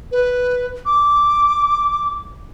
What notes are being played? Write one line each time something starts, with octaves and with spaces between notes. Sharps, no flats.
B4
D6